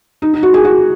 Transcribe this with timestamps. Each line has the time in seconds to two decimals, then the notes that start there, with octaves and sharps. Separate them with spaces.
0.22 D#4
0.33 D#4
0.43 F#4
0.54 G#4
0.65 F#4